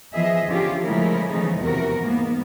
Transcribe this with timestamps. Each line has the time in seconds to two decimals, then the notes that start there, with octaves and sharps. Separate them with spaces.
0.15 E3 F3 B3 G#4 D#5 E5
0.48 D3 E3 F3 C#4 F4 G4
0.85 C#3 F3 G#3 A3 E4 A#4
1.29 C#3 E3 F3 A3 B3 D#4
1.61 E2 C3 E3 F#4 A#4
2.00 G#2 A#3 B3